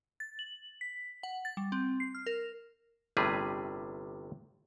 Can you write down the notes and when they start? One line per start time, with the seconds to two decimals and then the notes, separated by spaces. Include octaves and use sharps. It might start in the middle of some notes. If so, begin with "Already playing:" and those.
0.20 A6
0.39 F#7
0.81 B6
1.23 F#5
1.45 A6
1.57 G3
1.72 C4
2.00 C7
2.15 F6
2.26 A#4
3.17 G1 A2 C3 G3 G#4 B4